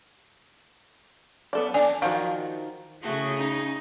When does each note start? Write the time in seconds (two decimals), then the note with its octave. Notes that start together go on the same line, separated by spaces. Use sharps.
1.53 B3 A4 D5
1.74 D4 D5 G#5
2.02 D#3 F3 F#4 F5
3.03 C#3 A3 E4 F#4 G#4
3.38 C#4 D#4